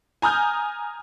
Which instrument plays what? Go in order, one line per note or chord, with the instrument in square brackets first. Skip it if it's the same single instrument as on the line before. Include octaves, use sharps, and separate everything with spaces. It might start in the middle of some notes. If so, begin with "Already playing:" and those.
[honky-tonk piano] G#5 A#5 D#6 F6 G6